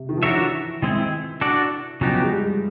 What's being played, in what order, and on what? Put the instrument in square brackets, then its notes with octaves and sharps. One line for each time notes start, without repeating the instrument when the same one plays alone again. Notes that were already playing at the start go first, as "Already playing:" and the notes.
Already playing: [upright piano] C3
D#3
F3
[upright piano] E3 [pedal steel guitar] D4 F#4 A#4 C#5 E5
[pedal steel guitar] D#3 G#3 C4 E4
D4 F#4 A4 D5
[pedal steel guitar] C#3 F#3 B3 D#4 G4 [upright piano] F3
[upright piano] G#3
G3